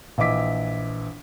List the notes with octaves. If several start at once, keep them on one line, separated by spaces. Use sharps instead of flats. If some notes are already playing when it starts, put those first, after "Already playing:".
A#1 E3 D#5 E5 D6 B6